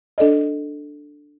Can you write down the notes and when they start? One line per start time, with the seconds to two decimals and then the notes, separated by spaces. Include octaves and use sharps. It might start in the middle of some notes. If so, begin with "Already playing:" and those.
0.18 D4 A4 D5 D#5